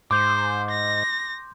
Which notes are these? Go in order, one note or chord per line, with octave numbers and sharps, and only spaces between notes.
G#2 C5 C6 D6 G6
A#6